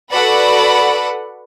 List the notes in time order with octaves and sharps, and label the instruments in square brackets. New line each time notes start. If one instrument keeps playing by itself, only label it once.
[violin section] F#4 A4 B4 D5 F#5 B5